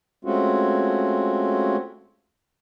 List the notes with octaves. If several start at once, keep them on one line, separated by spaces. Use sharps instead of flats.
G#3 A3 C4 C#4 F4 F#4